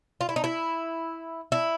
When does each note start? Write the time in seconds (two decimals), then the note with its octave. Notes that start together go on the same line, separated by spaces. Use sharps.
0.21 F4
0.29 E4
0.36 D#4
0.44 E4
1.52 E4